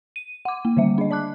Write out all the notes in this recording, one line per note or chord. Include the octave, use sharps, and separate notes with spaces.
D#7
F#5 D6
A#3
D3 D#3 G3 E5
D4 D#5
D5 A5 D6 F#6